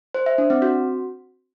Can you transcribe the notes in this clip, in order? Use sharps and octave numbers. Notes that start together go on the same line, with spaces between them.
C5
E5
D4
C4
F#4